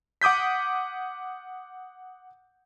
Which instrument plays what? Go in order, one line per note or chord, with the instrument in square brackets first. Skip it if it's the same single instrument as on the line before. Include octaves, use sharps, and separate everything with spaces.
[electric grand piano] F#5 D6 D#6 G6 B6